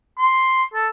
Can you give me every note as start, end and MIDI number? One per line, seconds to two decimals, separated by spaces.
0.19 0.65 84
0.74 0.88 69